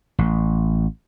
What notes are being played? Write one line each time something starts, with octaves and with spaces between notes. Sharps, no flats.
A1